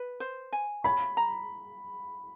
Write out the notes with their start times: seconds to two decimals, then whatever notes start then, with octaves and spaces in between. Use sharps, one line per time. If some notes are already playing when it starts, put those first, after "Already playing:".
Already playing: B4
0.20 C5
0.52 G#5
0.84 C#5 B5
1.17 A#5